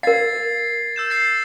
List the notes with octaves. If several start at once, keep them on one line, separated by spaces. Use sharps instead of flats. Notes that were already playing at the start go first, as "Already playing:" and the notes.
A#4 F5 G#6 A6 C7
E6 G6 E7
A6 C7